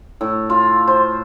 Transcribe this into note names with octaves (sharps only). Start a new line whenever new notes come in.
A2
F4
C5